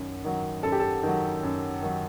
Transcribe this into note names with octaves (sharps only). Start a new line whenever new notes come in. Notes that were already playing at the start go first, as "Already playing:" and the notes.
Already playing: F#2 D#3 F#3
D#3 F#3
F#2 A4
G4
A4
D#3 F#3
F#2
D#3 F#3